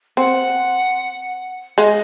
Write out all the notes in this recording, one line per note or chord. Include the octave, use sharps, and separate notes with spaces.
C4 F#5
G#3 D#5 F5